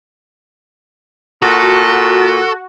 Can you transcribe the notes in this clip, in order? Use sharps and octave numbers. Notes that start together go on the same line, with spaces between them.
A#2 F#4 A4